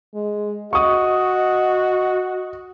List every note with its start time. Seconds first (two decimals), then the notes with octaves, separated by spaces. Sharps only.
0.15 G#3
0.73 F#4 D#5 C#6 D#6